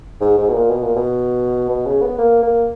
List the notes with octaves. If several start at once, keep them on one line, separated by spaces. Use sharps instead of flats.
G#2
G#2
B2
A#2
B2
A#2
B2
B2
C#3
B3
A#3
A#3